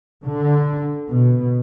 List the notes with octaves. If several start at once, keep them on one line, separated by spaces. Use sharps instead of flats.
D3
B2